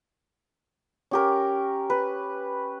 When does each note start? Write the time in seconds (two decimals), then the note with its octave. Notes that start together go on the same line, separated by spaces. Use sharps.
1.11 C#4 G4 A#4
1.90 B4